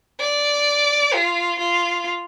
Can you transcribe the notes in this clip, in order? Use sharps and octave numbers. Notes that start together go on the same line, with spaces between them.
D5
F4
F4